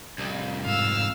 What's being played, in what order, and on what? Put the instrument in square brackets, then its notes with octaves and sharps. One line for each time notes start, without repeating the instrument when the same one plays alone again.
[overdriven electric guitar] C2 F2
[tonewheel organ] G#2 [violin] F5 E6